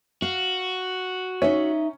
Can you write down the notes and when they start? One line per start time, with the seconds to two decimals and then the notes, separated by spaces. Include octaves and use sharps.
0.22 F#4 F5
1.42 C#4 D#4 E5